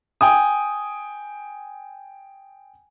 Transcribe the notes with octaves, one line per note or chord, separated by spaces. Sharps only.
G5 G#5 D#6